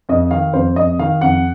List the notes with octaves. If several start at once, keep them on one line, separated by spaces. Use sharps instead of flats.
F2 D#5
D#3 F5
F2 C5
F2 D#5
D#3 F5
F2 F#5